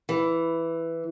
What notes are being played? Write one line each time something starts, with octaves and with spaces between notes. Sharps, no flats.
E3